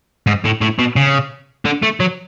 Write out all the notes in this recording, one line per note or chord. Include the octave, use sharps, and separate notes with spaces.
G#2
A2
A2
B2
C#3
D3
A3
F#3